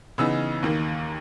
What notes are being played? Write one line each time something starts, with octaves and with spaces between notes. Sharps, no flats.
C#3 E3 B3 D#4 E6
D#2 D#3 A#3